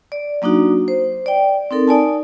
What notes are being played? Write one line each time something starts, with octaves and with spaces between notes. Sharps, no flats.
D5
F#3 A#3 D4 D#4 F#4
C5
D5 G5
C4 D#4 A4 A#4
D#4 D5 G#5 A5